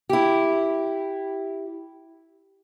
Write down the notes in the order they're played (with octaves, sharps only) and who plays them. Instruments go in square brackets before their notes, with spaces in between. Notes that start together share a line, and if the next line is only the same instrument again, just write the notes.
[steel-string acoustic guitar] E4 G4